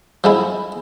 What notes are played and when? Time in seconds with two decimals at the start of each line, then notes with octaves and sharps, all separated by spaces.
0.24 F3 G#3 E4